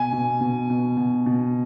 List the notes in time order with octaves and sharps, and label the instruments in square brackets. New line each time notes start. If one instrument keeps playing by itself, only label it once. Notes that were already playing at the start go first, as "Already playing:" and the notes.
Already playing: [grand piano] B2 G#5
B2
B2
B2
B2
B2